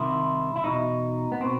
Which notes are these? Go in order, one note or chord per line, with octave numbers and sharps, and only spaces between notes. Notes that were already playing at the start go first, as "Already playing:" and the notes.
Already playing: C2 C3 D#3 E4
E4
E2 B2 D#4
B3
B2 C4